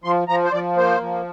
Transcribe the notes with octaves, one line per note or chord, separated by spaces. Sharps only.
F3 C6
F3 A#5
C5
F3 D5
A#3 C5
F3